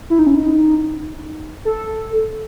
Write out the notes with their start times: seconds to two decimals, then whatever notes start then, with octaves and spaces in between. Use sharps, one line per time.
0.10 E4
0.19 D#4
0.27 C#4
0.35 D#4
1.65 A4